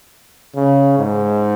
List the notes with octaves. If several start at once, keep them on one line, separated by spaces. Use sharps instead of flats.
C#3
G#2